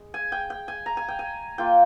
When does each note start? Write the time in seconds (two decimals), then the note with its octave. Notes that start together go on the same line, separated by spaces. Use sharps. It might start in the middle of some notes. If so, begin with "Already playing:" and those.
Already playing: G#3
0.14 G#5
0.32 G5
0.50 G5
0.68 G#5
0.86 A#5
0.97 G#5
1.08 G5
1.19 G#5
1.58 A#3 F4 G5